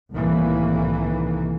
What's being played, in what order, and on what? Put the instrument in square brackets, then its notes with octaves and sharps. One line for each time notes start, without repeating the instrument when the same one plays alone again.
[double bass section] C2 A2 D#3 E3 A#3